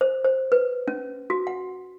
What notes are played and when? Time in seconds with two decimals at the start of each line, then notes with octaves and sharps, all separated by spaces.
0.01 C5
0.24 C5
0.52 B4
0.88 C#4
1.30 F#4
1.47 F#5